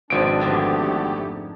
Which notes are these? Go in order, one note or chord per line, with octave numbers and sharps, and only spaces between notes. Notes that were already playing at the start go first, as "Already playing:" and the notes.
G#1 B2 F3 G#3 D4 D7
F2 G#2 D3 A3 B3 G4